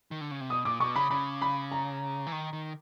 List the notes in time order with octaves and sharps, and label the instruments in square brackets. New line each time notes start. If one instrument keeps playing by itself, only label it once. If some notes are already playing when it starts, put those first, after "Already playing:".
[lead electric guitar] D#3
D3
C#3
C3
[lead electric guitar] B2 [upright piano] D#6
[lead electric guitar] A#2 [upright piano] D6
[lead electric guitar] B2 [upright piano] C#6
[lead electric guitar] C#3 [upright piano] B5
[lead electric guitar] C#3 [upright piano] B5
[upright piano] B5
A#5
[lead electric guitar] E3
D#3
D#3